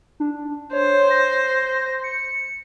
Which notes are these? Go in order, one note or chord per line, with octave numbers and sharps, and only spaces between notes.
D4
C5 C#5
A#6
C#7